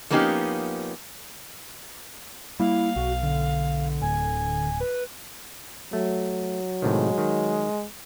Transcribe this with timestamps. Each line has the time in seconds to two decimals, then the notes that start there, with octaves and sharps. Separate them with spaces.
0.10 F3 A#3 B3 C#4 D#4 G4
2.59 G3 A#3 E4 F5
2.96 B1 F#4
3.23 D3
4.02 D1 G#5
4.80 B4
5.93 F#3 A3
6.82 A2 C3 D#3 G#3
7.18 D#3